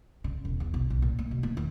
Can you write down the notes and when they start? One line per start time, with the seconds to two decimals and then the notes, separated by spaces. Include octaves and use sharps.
0.24 C#3
0.45 E1
0.60 E2
0.74 B1
0.90 B1
1.02 A#2
1.19 A#3
1.31 B2
1.43 A#3
1.57 D#2